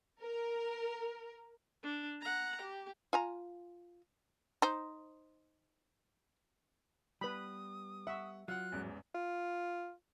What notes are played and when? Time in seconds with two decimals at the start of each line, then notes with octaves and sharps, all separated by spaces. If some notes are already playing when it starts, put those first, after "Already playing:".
0.22 A#4
1.83 D4
2.21 F#5 A#5
2.61 G4
3.13 F4 G#5 A#5
4.62 D#4 C5
7.21 G3 B3 B4 B5 D#6
8.07 E5 F#5 C#6
8.48 F#3 F4 F#5 F#6
8.72 A1 E2 G#2
9.15 F4